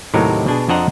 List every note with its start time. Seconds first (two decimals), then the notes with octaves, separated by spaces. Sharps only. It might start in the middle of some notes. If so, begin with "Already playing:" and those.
0.14 D#2 A2 C3 F#3 D#4 A#4
0.46 B2 D4 G#4
0.68 F2 D4 C5 D#5 F#5 A#5